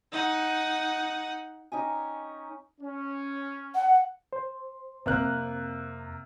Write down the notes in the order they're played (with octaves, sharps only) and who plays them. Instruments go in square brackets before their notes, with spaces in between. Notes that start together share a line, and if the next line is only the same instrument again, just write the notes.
[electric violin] D#4 F#5
[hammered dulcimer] C#4 D#4 G4 G#5
[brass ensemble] C#4
[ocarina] F#5
[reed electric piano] C5
[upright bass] F2 D#4 [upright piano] C3 A#3 F#6